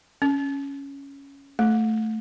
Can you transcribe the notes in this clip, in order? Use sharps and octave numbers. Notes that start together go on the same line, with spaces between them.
C#4
A3